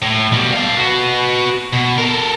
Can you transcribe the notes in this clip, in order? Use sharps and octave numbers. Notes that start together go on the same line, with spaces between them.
A2
B2 G3
A4 F5
F#4 B4
B2
A4 A#4